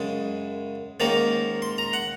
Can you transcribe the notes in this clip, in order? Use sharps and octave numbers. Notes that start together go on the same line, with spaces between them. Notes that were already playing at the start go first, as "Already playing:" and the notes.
Already playing: F#2 C#3 G#3
G#2 D#3 A#3 C#4 A#5
C6
A#5
F#5